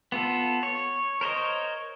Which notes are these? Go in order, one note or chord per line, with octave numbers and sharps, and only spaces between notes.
B3 F4 A4
C#5
A#4 C5 C#5 D#5